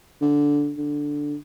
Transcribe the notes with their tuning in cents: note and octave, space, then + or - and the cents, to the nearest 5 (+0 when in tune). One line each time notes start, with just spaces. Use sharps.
D3 -10
D3 +0